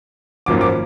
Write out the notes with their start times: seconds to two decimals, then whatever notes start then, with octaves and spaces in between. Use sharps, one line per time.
0.46 G#1 F#2 F3 A#3 D6
0.61 D6